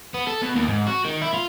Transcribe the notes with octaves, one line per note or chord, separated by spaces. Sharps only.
B3
A4
B2
D#2
G#2
F#4
D#3
E4
F4